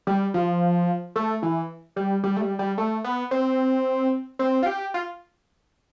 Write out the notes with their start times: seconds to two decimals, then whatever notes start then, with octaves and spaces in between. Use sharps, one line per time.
0.07 G3
0.34 F3
1.16 A3
1.42 E3
1.96 G3
2.23 G3
2.37 A3
2.41 G3
2.59 G3
2.78 A3
3.04 B3
3.31 C4
4.39 C4
4.63 F4
4.66 G4
4.94 F4